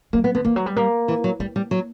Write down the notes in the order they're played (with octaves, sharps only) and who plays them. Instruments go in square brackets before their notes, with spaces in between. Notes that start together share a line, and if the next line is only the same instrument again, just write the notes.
[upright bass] F#3 [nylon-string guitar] A#3
[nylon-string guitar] B3
[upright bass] D3 [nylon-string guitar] B3
[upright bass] E3 [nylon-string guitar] A#3
[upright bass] F#3
G3
[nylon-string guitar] G3 [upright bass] A#3
[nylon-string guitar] E3
F#3
[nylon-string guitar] G3 [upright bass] A#3
[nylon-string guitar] G3
F#3